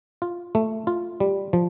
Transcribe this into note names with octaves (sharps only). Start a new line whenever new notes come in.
F4
A3
F4
G3
F3